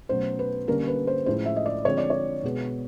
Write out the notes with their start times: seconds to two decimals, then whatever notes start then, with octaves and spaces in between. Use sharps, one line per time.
0.09 B2 F#3 A3 C#4 C5
0.39 B4
0.67 D3 G3 A#3 C#4 A#4
0.88 B4
1.07 C5
1.26 A2 F3 G#3 C#4 C5
1.46 E5
1.56 D#5
1.66 D5
1.85 D3 F3 G#3 C4 C#5
1.98 D5
2.10 C#5
2.43 B2 G#3 B3